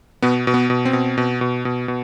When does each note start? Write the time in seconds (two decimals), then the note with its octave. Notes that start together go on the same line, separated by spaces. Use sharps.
0.22 B2 B3
0.47 B2
0.54 B3
0.70 B2
0.85 C4
0.93 B2
1.18 B2
1.41 B2
1.65 B2
1.88 B2